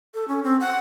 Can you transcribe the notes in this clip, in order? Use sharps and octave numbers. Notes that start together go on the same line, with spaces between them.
A4
C#4
C4
F#5